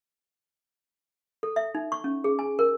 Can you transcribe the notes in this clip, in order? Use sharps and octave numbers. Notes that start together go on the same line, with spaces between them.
A4
E5
D#4
C#6
C#4
G#4
G#5
A#4